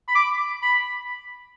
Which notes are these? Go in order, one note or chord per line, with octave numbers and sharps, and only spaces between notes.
B5
D6
B5